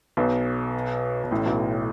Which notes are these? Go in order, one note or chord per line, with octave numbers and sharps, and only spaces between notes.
B1 B2
B2
A1 A2
B1 B2